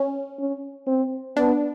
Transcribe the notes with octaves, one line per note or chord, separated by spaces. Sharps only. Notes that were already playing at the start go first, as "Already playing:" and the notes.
Already playing: C#4
C#4
C4
B3 D4